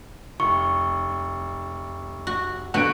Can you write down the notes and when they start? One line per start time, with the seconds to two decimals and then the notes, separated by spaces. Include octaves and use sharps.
0.40 F1 C#6
2.27 F#4
2.74 D3 B3 F#4 F#5 F#6 D7